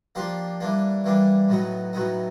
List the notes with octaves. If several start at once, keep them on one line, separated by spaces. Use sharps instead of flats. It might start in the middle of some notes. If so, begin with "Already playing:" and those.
F3 A#3 D4 G4 C5
E3 G3 A#3 D4
E3 G3 A#3 D4
A2 F#3 B3 D#4
A2 F#3 B3 D#4